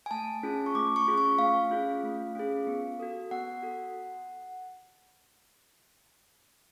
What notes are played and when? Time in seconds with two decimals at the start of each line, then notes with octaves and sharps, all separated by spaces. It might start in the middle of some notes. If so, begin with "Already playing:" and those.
0.06 G#5
0.11 A3 A5
0.43 C#4 F4 G#4
0.66 C#6
0.75 A3 D6
0.96 C#6
1.08 C#4 F4 G#4
1.18 C#6
1.39 A3 F5
1.70 C#4 F4 G#4
2.03 A3
2.35 C#4 F4 G#4
2.67 B3
3.00 F#4 A4
3.31 B3 F#5
3.63 F#4 A4